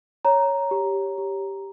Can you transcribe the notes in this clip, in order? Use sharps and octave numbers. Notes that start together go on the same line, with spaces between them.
C#5 A#5
G4
G4